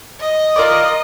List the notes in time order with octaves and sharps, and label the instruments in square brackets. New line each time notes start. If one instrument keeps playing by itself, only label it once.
[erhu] D#5
[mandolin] F4 A#4 D5